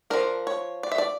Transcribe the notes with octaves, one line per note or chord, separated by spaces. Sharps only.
F3 A3 D4 A#4
C#5
D5
E5
D5